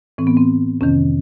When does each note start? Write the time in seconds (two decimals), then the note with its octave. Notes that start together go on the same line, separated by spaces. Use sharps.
0.18 A2 E3 C4
0.27 B3
0.37 C4
0.81 F2 C3 D#3 C#4